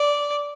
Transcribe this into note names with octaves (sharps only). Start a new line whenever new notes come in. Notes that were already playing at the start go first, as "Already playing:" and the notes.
Already playing: D5